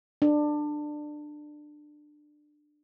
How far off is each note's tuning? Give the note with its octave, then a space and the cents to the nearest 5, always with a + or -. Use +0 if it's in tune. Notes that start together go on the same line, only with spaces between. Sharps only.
D4 +20